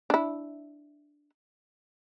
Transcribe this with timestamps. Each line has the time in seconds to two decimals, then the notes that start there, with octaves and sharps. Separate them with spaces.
0.10 D4 E4